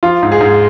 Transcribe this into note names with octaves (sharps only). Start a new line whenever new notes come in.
F3 F4
G#2
G#4
G#2